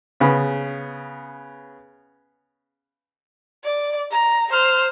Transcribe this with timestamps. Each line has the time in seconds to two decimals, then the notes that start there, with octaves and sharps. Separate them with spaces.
0.20 C#3 B3
3.64 D5
4.11 A#5
4.52 C5 F6